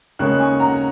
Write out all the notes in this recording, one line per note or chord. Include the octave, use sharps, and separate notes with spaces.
D#2 C#3 G#3 C#4 C#6 F#6
G#5 C#6
F#5 A#5